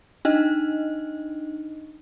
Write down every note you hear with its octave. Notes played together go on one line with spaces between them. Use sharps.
D4 D#4 D#5